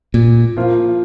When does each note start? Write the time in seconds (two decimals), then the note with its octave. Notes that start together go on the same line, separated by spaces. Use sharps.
0.14 A#2
0.56 F3 A#3 F4